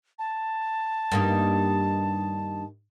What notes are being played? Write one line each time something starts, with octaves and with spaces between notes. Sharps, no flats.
A5
G2 D#3 A#3